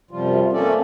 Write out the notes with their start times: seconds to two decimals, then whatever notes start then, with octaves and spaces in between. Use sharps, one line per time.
0.11 F#2 C3 F3 G3 F4
0.53 A3 A#3 C4 C#4 A4 D5